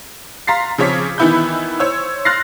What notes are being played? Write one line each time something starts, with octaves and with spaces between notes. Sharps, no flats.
F5 A#5 C6 A6 B6 C7
C#3 F3 C4 C#5 D6 B6
D#3 E3 B3 E4 B5 G6
C5 C#5 E6
C6 F6 F#6 A6 A#6 C7